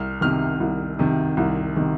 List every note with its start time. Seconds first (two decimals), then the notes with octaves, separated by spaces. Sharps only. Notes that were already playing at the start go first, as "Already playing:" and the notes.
Already playing: C2 F6
0.21 C3 D#3 F6
0.60 C2
0.99 C3 D#3
1.37 C2
1.76 C3 D#3